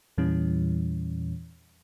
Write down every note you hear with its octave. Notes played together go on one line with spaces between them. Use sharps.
E2 A#2 E3 G3 C#4